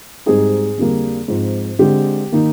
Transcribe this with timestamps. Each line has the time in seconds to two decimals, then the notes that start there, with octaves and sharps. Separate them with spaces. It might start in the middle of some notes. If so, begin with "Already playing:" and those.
0.26 G#2 G3 C4 D#4 G#4
0.78 F2 D3 G3 A#3
1.28 G#2 F3 C4
1.79 D3 G#3 C4 G4
2.32 D#3 A#3 D#4